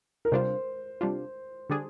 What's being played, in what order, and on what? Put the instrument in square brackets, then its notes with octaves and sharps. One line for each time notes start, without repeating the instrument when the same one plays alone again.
[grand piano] A#4
[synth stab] C3 G3 D4 F4 [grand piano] C5
[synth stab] C3 G3 D4 F4
D3 G3 D4 G#4